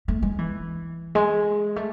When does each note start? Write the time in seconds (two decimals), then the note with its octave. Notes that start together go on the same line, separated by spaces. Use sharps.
0.08 A3
0.23 G#3
0.39 E3
1.15 G#3
1.76 A3